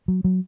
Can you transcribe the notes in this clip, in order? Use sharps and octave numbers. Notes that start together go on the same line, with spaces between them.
F#3
F#3